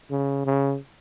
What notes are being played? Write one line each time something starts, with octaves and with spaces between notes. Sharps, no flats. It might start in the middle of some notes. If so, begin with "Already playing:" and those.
C#3
C#3